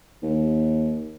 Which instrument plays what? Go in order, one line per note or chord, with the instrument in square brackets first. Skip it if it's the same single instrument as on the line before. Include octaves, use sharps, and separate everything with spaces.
[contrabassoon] D#2